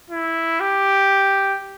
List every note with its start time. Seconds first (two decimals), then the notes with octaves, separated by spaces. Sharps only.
0.10 E4
0.60 G4